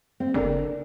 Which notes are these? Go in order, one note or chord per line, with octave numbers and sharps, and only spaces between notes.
C4
F#1 D4 A4 A#4